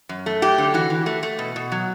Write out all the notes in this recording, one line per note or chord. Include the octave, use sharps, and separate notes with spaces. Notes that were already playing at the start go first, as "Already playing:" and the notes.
F#2
A3
F#3 G4
D3
E3 F#4
E3
A3
A3
B2
B2
F#3